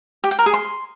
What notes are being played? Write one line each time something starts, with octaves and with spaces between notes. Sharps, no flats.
G4
G5
A#4
G#4
C6